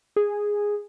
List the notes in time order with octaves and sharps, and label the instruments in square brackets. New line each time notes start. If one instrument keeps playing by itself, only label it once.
[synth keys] G#4